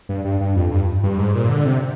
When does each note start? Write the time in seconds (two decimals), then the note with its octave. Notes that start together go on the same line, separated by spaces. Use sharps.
0.09 G2
0.25 G2
0.41 G2
0.56 F2
0.71 G2
1.03 G2
1.18 G#2
1.35 A#2
1.49 D3
1.65 C3